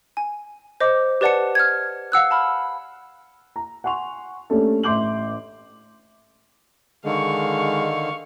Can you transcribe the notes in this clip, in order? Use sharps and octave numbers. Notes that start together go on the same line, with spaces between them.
G#5
C5 D#5 D6
G4 B4 D5 F#5 A5 C#7
F6 G#6
F5 F#5 E6 F#6
A5 B5 F6
A#5
F#5 G#5 C6 C#6 F7
A3 A#3 C#4 D4 G4 A4
A1 E5 C6 D6 G6 F#7
D3 D#3 G#3 F5 C#6